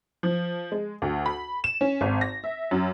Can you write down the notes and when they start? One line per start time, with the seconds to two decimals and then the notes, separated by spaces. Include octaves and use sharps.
0.23 F3
0.72 G#3
1.02 D2
1.26 B5
1.64 E7
1.81 C#4
2.01 G#1
2.21 A#6
2.44 E5
2.71 F#2